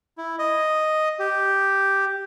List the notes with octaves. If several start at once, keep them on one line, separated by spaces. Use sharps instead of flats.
E4
D#5
G4